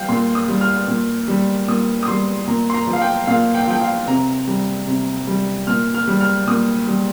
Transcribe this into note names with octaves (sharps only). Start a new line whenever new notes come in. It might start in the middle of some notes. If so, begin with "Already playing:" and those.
Already playing: G3 F5 G5
A#2 C6
D#6
G3
F6
A#2
G3
A#2 D#6
D#6
G3 C6
A#2 A#5
C6
A#5
F3
F5
G5
A#2 F5
G5
F5
F3 G5
F5
C3 A#5
G3
C3
G3
A#2 F6
F6
G3
F6
A#2 D#6
G3